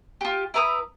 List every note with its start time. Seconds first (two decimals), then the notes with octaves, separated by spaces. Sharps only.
0.21 F4 G4
0.54 E4 B4 A#5 D#6